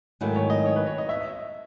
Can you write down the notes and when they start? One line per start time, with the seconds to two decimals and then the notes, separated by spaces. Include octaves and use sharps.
0.21 G#2 D#3 F#3 A3 E4
0.36 C#5
0.50 D#5
0.66 C#5
0.76 B4
0.87 C#5
0.98 D#5
1.09 E5